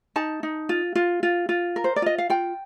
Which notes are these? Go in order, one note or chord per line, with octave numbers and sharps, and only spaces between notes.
D#4 A5
D#4
F4
F4
F4
F4
A#4
C5
D5
F4 D#5
F5
F4 G5